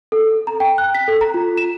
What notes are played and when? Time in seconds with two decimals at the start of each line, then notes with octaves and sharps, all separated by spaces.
0.12 A4
0.47 A#5
0.60 G5
0.78 F#6
0.95 B6
1.08 A4
1.21 A#5
1.34 F4
1.57 E7